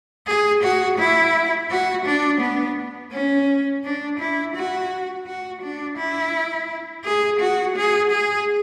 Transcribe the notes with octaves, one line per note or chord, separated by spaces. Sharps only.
G#4
F#4
E4
F#4
D4
B3
C#4
D4
E4
F#4
F#4
D4
E4
G#4
F#4
G#4
G#4